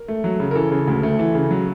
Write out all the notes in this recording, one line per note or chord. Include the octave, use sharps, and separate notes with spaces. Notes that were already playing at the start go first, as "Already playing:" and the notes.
Already playing: A#4
A3
F#3
C#3
A#4
E3 A4
C#3
D2
A3
E3
C#3
F#3